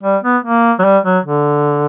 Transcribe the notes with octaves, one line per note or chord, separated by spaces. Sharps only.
G3
B3
A#3
F#3
G3
F#3
D3